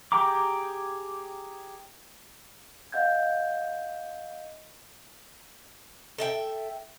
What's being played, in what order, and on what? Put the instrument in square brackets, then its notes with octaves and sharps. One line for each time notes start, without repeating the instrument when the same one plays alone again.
[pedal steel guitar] G4 G#4 G5 A#5 D6
[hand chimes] D#5 F5 F#5 G6 G#6
[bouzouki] A4 E5 G5